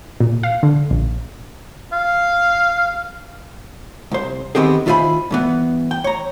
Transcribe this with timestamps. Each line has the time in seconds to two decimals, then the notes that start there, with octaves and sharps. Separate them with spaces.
0.20 A#2
0.43 F5
0.63 D3
0.91 A#1
1.92 F5
4.11 C2 C5
4.55 D#3 B3 C4 G4 G#4
4.86 D#3 E4 F4 C5 G#5 B5
5.31 G2 E3 B3
5.91 G5
6.04 C#5 A#5